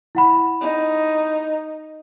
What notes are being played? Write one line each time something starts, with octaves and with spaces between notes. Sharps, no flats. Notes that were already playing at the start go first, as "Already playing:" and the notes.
E4 F#5 B5
D#4